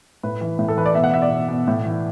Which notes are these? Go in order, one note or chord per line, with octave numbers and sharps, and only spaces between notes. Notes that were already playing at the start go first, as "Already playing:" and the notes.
A2 B4
E3
A2
A4
E3 B4
D5
B2 E5
F#5
B2 E5
D5
B2
B2
A2
E3